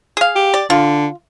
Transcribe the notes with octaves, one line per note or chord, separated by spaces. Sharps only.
G#4 F5
G4
D5
D3 F4